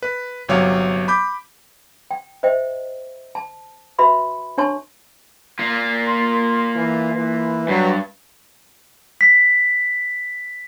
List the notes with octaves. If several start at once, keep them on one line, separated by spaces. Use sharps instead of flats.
B4
G1 C3 F#3 C#5 F5
B5 D6 G6
G5
C5 D#5 E5 G5
A5
F#4 B4 E5 B5 C6
D4 C#5 A5 C6 C#6
A#3 F4
C6
E3
E3 B4
G2 F#3
B6